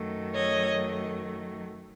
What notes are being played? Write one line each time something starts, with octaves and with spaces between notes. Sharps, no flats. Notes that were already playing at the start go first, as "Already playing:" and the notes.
Already playing: F#2 D#3 F#3 A3
C#5 D#5